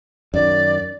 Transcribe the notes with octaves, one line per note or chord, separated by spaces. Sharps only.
F#2 D#3 D5